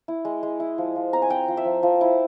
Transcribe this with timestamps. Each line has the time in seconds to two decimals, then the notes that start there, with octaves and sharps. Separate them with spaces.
0.08 E4
0.25 G#3
0.43 G#3
0.60 E4
0.78 F3
0.96 F3
1.13 C4 A#5
1.22 G#5
1.30 C4 G5
1.48 F3
1.57 E5
1.65 F3
1.83 F3
2.01 E4